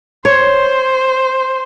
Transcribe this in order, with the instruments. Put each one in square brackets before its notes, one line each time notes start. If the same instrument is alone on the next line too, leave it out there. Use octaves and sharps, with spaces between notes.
[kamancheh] C5 [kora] C#5